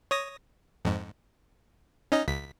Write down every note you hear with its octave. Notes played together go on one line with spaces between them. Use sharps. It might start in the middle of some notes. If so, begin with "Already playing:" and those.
C#5 D#6 A#6
F2 G#2
C#4 D#4 D#5
C#2 B6